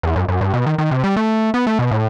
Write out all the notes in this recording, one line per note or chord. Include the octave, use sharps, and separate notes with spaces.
E2
F#2
F#2
G2
B2
D#3
D#3
C3
G3
A3
B3
A3
B2
A2